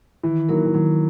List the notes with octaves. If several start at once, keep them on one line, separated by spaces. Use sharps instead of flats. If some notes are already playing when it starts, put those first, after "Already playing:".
D#3 E3
F#3 A#3 D#4 A#4
E3
D#3 F#3